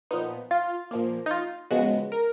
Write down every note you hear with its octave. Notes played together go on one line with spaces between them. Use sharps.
A#2 F3 B3 D#4
F4
A#2 F3 A#3
D#4
F4
C#3 F3 G#3 B3 F#4
A#4